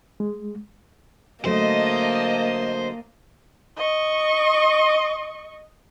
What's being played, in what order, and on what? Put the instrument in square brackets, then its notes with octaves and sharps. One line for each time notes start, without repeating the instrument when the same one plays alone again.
[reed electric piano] G#3
[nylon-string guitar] D3 F#3 A3 [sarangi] A#3 [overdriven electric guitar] C5 [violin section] D#5 A5
[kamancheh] D#5 C#6